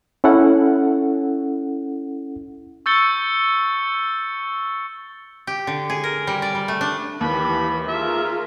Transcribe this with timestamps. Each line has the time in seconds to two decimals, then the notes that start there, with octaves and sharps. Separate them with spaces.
0.24 C#4 E4 A4 F#5
2.86 C#6 E6 G6 A6 C#7 G7
5.47 G4
5.67 D3
5.90 G#4
6.04 A#4
6.27 G3
6.42 D5
6.55 G3
6.68 A3
6.81 D4
7.21 D#2 E3 G4 B5
7.88 F4 G#4 A#4 E5